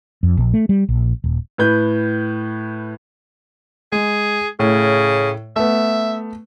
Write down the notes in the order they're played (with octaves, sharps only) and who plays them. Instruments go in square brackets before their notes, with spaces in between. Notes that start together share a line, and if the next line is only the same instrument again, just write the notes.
[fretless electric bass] F2
A#1
A3
G3
A#1
D#1
[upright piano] A2 B4 G6
[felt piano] G#3 [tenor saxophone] G#4
[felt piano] A2 [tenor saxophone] C#3
[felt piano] A3 B3 [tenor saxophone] E5